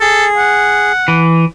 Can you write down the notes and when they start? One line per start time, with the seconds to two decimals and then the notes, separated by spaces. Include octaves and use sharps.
0.01 G#4 A4
0.37 F#5
1.08 E3